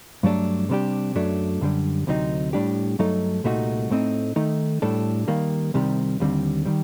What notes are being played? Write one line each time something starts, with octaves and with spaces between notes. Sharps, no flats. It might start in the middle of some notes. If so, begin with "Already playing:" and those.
G2 F#3 A3 D4 A4
C3 G3 D4 G4
F#2 F#3 A3 D4
F#2 D3 G3
D2 C3 F#3 C4 D#4
A2 G3 D4 G4
G2 F#3 A3 D#4 A4
C2 A#2 A3 D#4 F#4
A2 A3 C4 D#4
D#3 A3 D#4
A2 G3 D4 A4
D#3 G3 A#3
C2 C3 D#3 G3
D#2 D3 G3 C4
D#3 G3